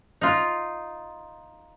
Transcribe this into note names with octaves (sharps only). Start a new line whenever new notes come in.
D#4 F4